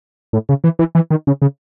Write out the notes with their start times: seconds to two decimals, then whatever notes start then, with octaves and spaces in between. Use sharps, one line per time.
0.33 A2
0.49 C#3
0.64 E3
0.79 E3
0.95 E3
1.11 D#3
1.27 C#3
1.42 C#3